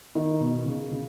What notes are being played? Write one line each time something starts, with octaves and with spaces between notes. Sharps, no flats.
D#3
B2
C#3
C#3